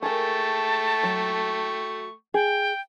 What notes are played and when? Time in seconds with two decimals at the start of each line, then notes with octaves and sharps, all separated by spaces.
0.02 A3 G#4 A#4 G5 A5 C#6
1.03 F#3
2.34 G#4 G5